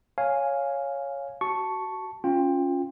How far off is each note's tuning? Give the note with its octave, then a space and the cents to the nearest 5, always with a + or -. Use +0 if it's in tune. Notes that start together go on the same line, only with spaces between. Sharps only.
C#5 +0 F5 +0 G#5 +0
F#4 +20 A5 +0 C#6 +0
C#4 +0 F4 +10 G5 +20